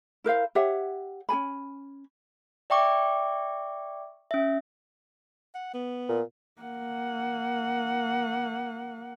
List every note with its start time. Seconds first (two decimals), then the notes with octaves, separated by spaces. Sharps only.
0.24 E4 A#4 C5 F5
0.55 G4 C#5 E5 F#5
1.29 C#4 G4 G#5 B5
2.70 D5 E5 G5 C#6 D6
4.31 C#4 E5
5.55 F#5
5.74 B3
6.09 A#2
6.61 A#3 F#5